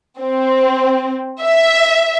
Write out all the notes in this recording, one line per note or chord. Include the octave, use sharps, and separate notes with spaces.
C4
E5